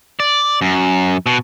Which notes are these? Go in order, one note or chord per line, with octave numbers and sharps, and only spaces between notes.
D5
F#2
B2